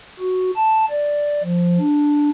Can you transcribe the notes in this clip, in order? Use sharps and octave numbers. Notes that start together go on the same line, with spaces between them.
F#4
A5
D5
F3
D4